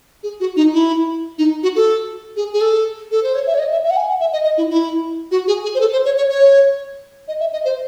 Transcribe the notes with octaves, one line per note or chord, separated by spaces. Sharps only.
G#4
F#4
D#4
E4
D#4
F#4
A4
G#4
G#4
A4
A4
C5
C#5
E5
C#5
D#5
E5
E5
F#5
G#5
F#5
E5
D#5
D#5
E4
E4
F#4
G#4
G#4
C5
A4
C5
C#5
C#5
C#5
D#5
E5
D#5
C5